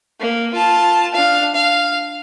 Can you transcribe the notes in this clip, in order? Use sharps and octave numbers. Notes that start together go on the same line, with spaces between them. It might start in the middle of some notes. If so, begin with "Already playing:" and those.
A#3
F4 A5
D4 F5
F5